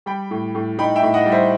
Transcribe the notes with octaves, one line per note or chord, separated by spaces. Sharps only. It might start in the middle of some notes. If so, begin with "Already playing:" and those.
G3 G5 B5
A2
A2
D#4 G5 B5
E5 G5
A2
D#5 F#5
G3
C5 E5